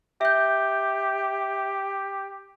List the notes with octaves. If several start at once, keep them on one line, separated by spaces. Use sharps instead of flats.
G4 E5 G6